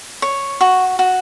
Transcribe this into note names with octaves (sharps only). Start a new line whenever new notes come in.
C#5
F#4 C#6
F#4